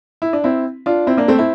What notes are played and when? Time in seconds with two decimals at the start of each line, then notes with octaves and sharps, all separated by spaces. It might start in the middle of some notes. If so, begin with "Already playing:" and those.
0.22 E4
0.33 D4
0.44 C4 E4
0.86 D4 F4
1.07 C4 E4
1.17 A#3 D4
1.28 A3 C4
1.38 C4 E4